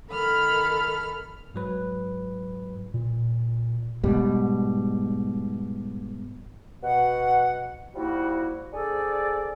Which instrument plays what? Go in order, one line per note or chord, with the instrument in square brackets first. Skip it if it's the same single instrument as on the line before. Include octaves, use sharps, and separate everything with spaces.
[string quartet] D#3 A4 B5 F6
[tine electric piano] G#2 F#3 B4
[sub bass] A#2
[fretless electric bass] G#2 B2 G3
[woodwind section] B2 F#5
F3 G3 A#3 D#4 E4 F#4
D4 G#4 A4 C5 D5